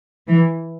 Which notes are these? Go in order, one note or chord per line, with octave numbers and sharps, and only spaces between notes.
E3